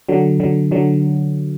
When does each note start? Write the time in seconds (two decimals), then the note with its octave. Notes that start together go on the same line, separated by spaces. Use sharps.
0.09 D3 F#3
0.40 D3 F#3
0.71 D3 F#3